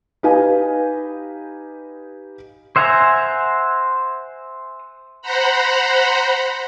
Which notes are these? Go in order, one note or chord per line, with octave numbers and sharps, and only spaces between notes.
D#4 G4 B4 D#5 F5 G#5
C5 E5 F#5 G#5 A#5
C5 F#5 A#5 B5